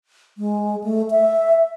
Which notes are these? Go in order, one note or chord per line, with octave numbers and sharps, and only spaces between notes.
G#3
A3
E5